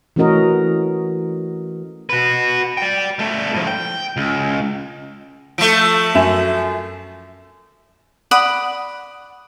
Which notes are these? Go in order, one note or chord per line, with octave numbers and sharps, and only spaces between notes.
E3 A3 C#4 F#4 A#4 D#5
F#4 B4
D5 G5
G3 A3
A2 F3
G5
C#2
F3 A3 D7
F#2 E5 E7
D5 F#5 B5 D#6